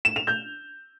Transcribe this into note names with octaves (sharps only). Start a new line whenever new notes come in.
E7
F7
G6